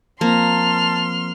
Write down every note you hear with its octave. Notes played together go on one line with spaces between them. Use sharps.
F3 A#3 C4 A5 C6 F6